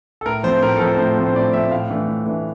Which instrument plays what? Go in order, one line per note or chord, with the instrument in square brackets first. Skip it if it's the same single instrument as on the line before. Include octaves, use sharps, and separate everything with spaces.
[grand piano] A4
A2 A#4
F3 A3 C4 C5
A2 A#4
A4
F3 A3 C4 A#4
A2 C5
F3 A3 C4
C5
A2 D5
F3 A3 C4 E5
A2 F5
E3 A3 D4
A2
E3 A3 D4